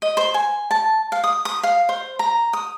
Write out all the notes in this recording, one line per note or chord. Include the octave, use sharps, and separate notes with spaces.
D#5
C5
G#5
A5
F5
D#6
D#6
F5
C5
A#5
D#6